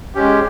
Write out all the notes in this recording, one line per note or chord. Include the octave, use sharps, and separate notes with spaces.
G#3 C#4 G4